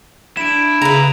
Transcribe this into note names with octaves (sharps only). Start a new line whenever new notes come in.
D4 E4 D7 E7
C#3 B4 A#5 F7